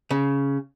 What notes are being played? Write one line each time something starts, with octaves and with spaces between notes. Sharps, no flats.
C#3